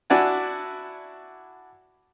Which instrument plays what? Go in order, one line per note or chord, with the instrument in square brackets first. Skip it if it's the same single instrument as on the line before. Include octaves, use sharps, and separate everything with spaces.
[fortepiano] D4 E4 F#4 D5 G#5